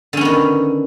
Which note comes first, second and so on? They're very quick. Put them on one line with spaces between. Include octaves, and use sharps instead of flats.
D3 C#4 B3 D#3